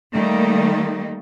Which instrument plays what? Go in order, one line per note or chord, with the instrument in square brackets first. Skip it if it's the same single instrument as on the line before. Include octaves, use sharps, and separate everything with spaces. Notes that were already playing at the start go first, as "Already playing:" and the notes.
[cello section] D#3 G3 A3 A#3 D#4